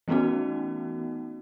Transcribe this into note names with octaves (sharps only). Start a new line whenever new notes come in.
E3 A3 B3 C#4 D#4 F#4